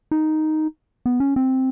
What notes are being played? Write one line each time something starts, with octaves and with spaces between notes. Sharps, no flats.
D#4
B3
C#4
C4